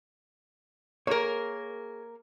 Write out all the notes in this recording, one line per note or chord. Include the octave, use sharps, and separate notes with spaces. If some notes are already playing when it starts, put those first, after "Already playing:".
A#3 G#4 A#4 C#5